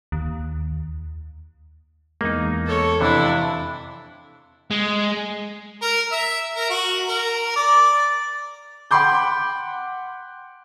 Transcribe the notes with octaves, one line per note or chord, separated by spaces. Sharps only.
D#2
E2 G#3 A#3 D#4
A4 C#5
F2 C3 E3 D4 E4
G#3
A#4
E5
A#4
F#4
A#4
D5
F#5 G5 B5 C6 D6 G6